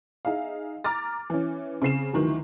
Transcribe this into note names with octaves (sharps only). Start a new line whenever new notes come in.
D#4 G#4 E5 F5
A#5 D6 F6 A6
E3 C#4
C#3 C4 C7 E7
D2 D#3 E3 F#3